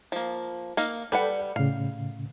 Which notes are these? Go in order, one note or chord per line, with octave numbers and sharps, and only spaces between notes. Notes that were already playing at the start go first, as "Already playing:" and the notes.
F3 A#3
A#3 D#4 F5
G3 A4 B4 D5 F#5 G5
A2 C#3 F5